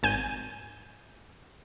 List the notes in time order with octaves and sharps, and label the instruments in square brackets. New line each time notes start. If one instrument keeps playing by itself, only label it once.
[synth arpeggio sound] G#1 G#5 G6 D#7